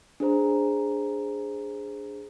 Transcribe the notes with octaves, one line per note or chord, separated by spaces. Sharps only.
D4 G#4 C5 A#5